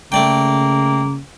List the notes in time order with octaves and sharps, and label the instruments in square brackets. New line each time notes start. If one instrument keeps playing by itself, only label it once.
[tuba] C#3 [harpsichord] A3 D5 G5 [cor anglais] A#3